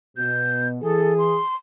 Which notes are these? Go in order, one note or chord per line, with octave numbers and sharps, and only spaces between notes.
B2 G6
E3 G#4 A4
C6